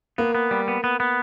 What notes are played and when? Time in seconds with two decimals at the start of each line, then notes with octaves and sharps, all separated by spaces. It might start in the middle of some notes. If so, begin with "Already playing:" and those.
0.18 A#3 B3
0.35 B3
0.51 G3
0.68 B3
0.84 B3
1.00 B3